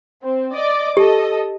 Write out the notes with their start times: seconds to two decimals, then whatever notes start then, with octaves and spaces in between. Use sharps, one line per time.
0.22 C4
0.52 D5 D#5 D6
0.97 G4 A4 D#5